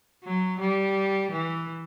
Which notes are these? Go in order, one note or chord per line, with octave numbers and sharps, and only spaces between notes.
F#3
G3
E3